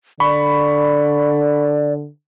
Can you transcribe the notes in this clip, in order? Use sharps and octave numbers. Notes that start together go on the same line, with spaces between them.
D3 D5 B5 C#6